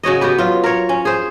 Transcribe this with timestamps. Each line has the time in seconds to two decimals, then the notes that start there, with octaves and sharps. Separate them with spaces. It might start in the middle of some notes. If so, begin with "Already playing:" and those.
0.03 C#3 F#4 C#5 D#5
0.21 B3 F#4 G4 B4
0.38 F#3 F4
0.64 A#4 C#5
0.89 C#4
1.05 G#4 C5